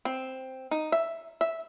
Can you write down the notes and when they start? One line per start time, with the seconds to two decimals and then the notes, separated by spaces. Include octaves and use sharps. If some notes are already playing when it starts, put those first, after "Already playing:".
0.05 C4
0.71 D#4
0.92 E5
1.41 E5